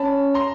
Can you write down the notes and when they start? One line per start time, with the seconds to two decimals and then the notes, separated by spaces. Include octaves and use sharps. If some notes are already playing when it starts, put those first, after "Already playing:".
Already playing: C#4 A5 B5
0.34 A#5 C6